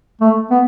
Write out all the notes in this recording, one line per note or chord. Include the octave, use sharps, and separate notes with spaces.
A3
B3